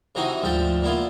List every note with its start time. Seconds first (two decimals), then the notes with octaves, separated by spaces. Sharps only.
0.15 C3 E3 D#4 F#4
0.42 D2 G#2 F3 G5 A5
0.82 A#2 B3 E4 F4